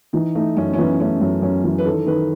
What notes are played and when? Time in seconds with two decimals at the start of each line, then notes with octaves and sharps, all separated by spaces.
0.13 E3 D#4
0.35 A3 D#4
0.57 F#2 C#4
0.74 C#4
0.78 E3 B3
1.00 A3 C#4
1.21 F#2
1.42 F#2 C#4
1.64 E3
1.78 B4
1.86 D#3 A4
2.06 D#3 B4